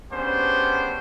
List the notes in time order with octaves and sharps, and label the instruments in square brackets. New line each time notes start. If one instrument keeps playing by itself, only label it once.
[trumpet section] B3 C#4 D4 G4 G#4 C5